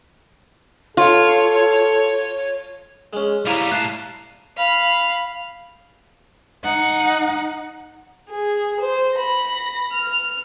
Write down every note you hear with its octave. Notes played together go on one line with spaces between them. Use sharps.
F4 A4 C#5
G#3 C#4
G3 E4 F5 A#5 D#7 F7
A2 A5 F#6 C7
F5 B5
D#4 F#5
G#4
C5
B5 A#6
F6